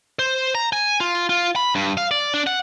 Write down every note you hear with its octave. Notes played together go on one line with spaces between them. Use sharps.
C5
A#5
G#5
F4
F4
B5
G2
F5
D5
D4
F#5